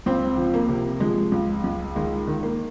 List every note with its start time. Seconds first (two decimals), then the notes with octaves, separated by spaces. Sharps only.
0.06 C#2 C4
0.37 F3
0.54 A#3
0.69 C3
1.00 F3 G#3
1.32 C#2
1.64 C#2
1.95 D#3 G#3
2.27 D#3
2.43 A#3